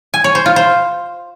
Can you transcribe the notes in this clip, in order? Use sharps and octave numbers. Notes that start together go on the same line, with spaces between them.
G#5
C#5
C5
F4
C5